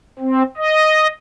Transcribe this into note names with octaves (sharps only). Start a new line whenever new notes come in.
C4
D#5